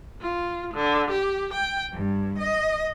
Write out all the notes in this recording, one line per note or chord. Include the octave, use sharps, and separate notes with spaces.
F4
D3
G4
G5
G2
D#5